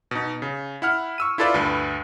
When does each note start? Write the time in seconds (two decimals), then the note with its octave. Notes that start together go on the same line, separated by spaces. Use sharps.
0.11 B2 D#4
0.42 C#3
0.82 E4 F#5 F6
1.18 C#6 E6 D#7
1.38 E4 F4 A4 B4 D5
1.54 D2 G2 B4